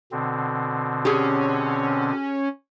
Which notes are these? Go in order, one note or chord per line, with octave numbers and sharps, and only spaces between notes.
B2 D3 C4
C#4 G4 G#4